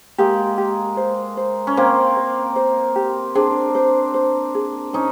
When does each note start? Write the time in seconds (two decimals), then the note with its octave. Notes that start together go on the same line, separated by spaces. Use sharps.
0.18 G#3 A#3 G4
0.58 G4
0.97 C5
1.37 C5
1.67 C#4
1.77 A#3 C4 C5
2.17 C5
2.56 C5
2.96 G4
3.35 C4 D4 G#4
3.75 C5
4.14 C5
4.55 G#4
4.93 C#4 D#4 C5